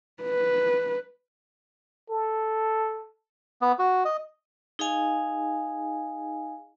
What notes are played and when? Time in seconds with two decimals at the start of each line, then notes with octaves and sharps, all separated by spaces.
0.23 B4
2.10 A4
3.62 B3
3.79 F#4
4.05 D#5
4.79 D#4 G#4 D#5 F5 G#5